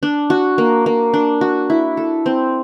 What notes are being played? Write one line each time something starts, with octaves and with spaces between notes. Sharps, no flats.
D4
F#4
A#3
A#3
D4
F#4
E4
A4
C4